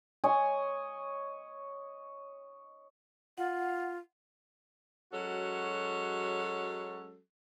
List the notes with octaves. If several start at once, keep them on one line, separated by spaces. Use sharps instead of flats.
C#5 D#5 G#5
F4 F#5
F#3 G#3 C#4 F#4 A4